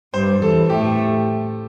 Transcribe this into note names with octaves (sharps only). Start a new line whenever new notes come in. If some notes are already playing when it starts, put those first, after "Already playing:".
G2 G3 C5
E2 E3 A4
A2 A3 G4